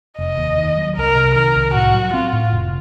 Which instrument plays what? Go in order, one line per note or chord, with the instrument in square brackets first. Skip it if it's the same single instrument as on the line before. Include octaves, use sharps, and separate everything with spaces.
[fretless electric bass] F1 [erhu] D#5
[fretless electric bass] D#2
D#3
F#3
[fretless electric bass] C2 [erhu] A#4
[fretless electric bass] C3
[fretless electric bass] D#3 [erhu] A#4
[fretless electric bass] C2
[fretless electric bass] A2 [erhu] F#4
[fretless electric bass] F#3
[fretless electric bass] C4 [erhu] F4
[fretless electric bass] A2
F1